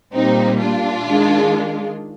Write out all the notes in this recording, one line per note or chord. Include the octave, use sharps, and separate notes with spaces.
A#2 G3 A#3 C4 D#4
D4 F4
D#3 G#3